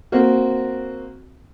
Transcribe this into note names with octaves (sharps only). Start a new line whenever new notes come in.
A#3 C4 F#4